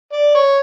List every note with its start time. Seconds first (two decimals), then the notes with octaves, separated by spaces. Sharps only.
0.12 D5
0.35 C#5